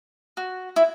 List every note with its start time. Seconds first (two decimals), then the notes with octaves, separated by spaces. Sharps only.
0.37 F#4
0.76 E4